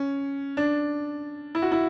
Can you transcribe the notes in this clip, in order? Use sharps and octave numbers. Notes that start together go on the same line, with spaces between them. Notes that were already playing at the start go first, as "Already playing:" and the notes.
Already playing: C#4
D4
E4
F#4
E4